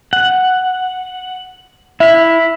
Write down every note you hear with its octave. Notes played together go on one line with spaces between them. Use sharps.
F#5
E4 E5 B6